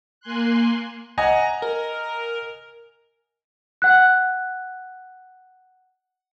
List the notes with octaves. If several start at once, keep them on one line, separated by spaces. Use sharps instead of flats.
A#3 G#5 C6 F#6
D#5 F#5 G#5 A#5
A#4
F#5 F#6